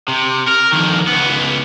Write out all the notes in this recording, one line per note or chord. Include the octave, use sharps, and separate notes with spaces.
C3
A#4
F2 D#3
C#2 B3